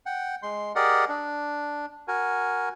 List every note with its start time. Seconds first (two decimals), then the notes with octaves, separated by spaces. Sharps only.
0.06 F#5 G5
0.43 G#3 C6
0.75 G4 G#4 A#4 D5 D#5 F#5
1.09 D4
2.08 F#4 A#4 G#5